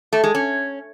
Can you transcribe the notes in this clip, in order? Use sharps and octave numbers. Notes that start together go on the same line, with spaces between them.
A3
G#3
C#4